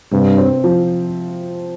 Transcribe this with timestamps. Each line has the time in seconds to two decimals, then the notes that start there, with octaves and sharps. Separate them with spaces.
0.12 G2 C3
0.38 C4
0.64 F3